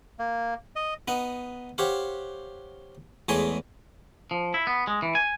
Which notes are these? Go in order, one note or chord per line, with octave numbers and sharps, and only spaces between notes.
A#3
D#5
B3 D#4 F#5
G4 C5 C#5 F5 F#5
E2 G#3 A3 C#5 G#5 C6
F3
E4
B3
G#3
E3
G#5